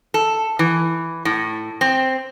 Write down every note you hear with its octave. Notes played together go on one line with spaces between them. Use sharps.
A4
E3
A2
C4